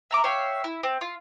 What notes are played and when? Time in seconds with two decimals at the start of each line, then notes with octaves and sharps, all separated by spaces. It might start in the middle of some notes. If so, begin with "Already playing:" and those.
0.11 E5 A#5 D6
0.24 C#5 E5 F5 G5
0.64 E4
0.83 C4
1.01 F4